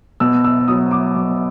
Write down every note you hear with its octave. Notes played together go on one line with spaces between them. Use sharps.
B2 E6
E6
F#3 D#6
D6
B2